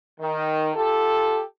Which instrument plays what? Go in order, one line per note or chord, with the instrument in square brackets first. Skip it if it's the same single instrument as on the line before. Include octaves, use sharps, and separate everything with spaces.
[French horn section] D#3
F4 G4 A4